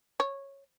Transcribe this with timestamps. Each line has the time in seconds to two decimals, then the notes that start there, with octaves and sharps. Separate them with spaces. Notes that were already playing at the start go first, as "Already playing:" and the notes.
0.20 C#5